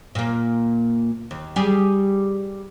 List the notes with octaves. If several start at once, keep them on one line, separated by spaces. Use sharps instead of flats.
A#2 A#3
D#2
G3 G4 G#4